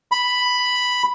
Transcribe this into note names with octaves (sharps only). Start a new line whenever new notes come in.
B5